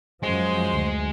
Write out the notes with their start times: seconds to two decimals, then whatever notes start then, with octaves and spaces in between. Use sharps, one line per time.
0.23 F#2 F3 G#3 F#4 C5
0.70 D2